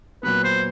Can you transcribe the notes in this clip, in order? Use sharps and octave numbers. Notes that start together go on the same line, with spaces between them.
A#2 F#3 B3 B4
C5